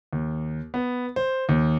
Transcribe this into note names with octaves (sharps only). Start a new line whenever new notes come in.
D#2
B3
C5
D#2